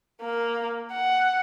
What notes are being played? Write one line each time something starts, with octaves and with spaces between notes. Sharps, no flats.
A#3
F#5